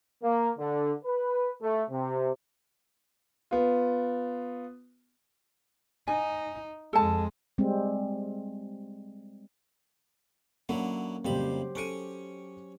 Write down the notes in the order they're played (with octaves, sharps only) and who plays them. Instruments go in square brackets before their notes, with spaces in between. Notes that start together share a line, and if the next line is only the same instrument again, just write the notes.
[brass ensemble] A#3
D3
B4
A3
C3
[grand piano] B3 F4
[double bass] D#4 [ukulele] G#5
[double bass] F2 G#3 [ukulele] A4 A5
[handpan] G3 G#3 C4
[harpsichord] D3 F#3 E4 [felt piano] A#3 C#4
[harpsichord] F2 G3 B5 [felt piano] C#3 A#3 [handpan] F#3 G4 C5
[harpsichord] C#4 C#6 [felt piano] A4 D7 D#7